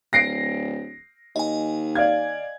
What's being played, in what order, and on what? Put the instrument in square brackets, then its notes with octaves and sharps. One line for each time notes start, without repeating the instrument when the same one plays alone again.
[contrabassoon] D1 [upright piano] A#6 C7 D7
[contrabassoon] D#2 [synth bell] D#5 G#5
[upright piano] D5 F5 G#6